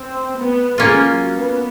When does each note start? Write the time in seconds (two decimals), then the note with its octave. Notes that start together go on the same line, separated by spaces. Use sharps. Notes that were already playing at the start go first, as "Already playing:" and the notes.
Already playing: C4
0.36 B3
0.78 G#3 A#3 C#4 F4
1.07 F#3
1.36 B3